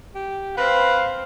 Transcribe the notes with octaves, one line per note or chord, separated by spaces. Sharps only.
G4
C4 B4 F5